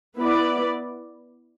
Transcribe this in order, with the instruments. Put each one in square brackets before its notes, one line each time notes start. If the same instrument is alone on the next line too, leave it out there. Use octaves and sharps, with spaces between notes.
[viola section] B3 E4 B4 D5